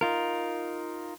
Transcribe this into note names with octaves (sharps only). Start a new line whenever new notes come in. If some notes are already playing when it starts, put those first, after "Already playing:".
D#4 F4 A#4